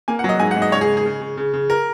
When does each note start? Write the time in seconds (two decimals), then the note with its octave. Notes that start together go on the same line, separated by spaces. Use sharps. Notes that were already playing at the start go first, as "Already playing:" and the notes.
0.08 A#3 G#5
0.19 F#5
0.24 F#3 D#5
0.40 G#2 G#5
0.51 F#5
0.56 G#2
0.62 D#5
0.72 C#3 C#5
0.81 G#4
0.89 C#3
0.97 G#4
1.06 C#3
1.21 C#3
1.37 C#3
1.53 C#3
1.70 A#4